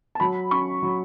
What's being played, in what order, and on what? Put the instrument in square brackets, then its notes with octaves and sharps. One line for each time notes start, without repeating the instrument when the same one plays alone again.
[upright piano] A5
F#3 B5
C#4 C#6
F#3